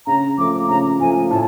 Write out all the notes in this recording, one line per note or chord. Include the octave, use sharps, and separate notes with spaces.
C#3 A#5
F3 A3 D6
C#3 A#5
F3 A3 G#5
A2 A5